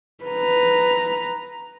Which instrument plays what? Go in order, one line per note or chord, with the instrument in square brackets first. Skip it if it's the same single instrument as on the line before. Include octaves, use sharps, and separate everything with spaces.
[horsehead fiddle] B4 A#5